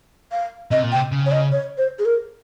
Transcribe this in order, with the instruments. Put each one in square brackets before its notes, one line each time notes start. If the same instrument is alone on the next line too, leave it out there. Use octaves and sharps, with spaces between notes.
[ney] F5
[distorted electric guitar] C3 [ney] D#5
[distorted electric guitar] A#2
[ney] G5
[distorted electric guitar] C3
C#3
[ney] C#5
D#5
C#5
C5
G#4
A#4